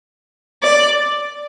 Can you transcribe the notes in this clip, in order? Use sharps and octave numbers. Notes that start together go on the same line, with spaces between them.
D5